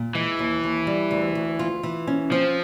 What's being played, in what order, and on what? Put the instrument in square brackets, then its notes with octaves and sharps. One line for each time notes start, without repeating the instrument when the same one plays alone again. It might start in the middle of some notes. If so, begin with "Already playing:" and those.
Already playing: [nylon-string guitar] A#2
[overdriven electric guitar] E3 [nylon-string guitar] G#3
[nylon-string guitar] D#2
D#2
G3
D2
D2
F4
E3
C#4
[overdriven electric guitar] F3 [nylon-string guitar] C4